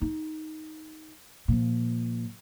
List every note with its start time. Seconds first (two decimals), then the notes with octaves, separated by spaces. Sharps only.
0.02 D#4
1.48 A#2 F3